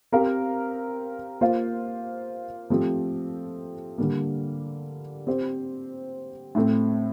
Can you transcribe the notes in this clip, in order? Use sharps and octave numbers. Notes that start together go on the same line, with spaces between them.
C4 G4 A#4 F5
A#3 F4 C5 F5
F3 A3 C4 G4
D3 G3 A#3
C4 G4 C5
A2 A3 C4